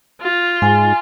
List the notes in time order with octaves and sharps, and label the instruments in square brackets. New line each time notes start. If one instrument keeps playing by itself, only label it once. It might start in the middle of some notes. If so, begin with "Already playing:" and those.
[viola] F4
[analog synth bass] G#2 [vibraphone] G#5